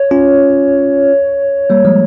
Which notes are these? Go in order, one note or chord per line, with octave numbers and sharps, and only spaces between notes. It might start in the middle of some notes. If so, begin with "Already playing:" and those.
Already playing: C#5
C#4 F4
G3 A#3
F3 G#3